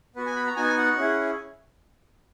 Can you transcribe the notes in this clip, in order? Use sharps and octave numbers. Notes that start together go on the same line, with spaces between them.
B3 F#4 B4
G#5
B5
A#5
B3 D#4 F#4 G#5
F#5
C#4 E4 G#4